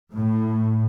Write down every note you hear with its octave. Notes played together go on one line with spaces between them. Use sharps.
A2